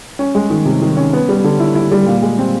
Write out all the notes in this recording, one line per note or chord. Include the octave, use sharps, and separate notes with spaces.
C#4
G#3
D#3
C3
D#3
C#4
B3
G3
D3
E4
E4
G3
A#2
G#3
C4